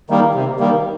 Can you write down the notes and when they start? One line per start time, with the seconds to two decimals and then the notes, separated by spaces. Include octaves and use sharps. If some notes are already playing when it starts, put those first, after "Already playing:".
0.10 D#3 G3 A#3
0.35 C3
0.59 D#3 G3 A#3